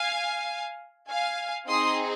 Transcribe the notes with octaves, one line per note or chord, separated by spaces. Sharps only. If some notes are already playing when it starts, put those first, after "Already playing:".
Already playing: F5 G#5
F5 G#5
C4 D#4 G#4 C6 D#6